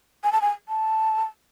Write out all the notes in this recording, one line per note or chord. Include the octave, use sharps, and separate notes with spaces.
G#5
A5
G#5
A5